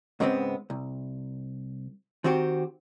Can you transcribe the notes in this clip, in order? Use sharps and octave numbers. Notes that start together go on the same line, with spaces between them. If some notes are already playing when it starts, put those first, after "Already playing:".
G#2 C#3 G3 G#3 B3 C4
C2
D#3 C4 F#4 G4